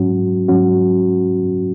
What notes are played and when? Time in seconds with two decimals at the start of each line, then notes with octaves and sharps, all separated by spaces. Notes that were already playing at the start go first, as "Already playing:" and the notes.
Already playing: G#2 F#3 C#4 F#4
0.48 G#2 F#3 C#4 F#4